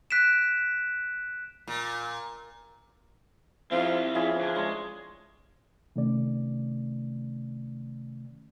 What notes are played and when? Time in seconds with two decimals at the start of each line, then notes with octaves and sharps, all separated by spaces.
0.11 F#6 B6 D7 E7
1.67 A#2
3.71 F3 C4 E4
4.15 E3 F3 C#4 G#4
4.41 D3
4.55 G#3 D4 C#5 C6
5.96 C3 D#3 A3 C#4 D5